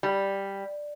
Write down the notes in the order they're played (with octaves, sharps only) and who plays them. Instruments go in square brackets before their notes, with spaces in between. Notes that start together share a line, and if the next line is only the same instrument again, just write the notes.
[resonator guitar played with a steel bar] G3